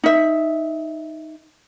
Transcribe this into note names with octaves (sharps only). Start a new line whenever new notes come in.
D#4 E5